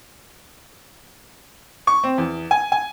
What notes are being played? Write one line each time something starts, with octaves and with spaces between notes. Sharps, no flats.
C#6
C4
E2
G#5
G#5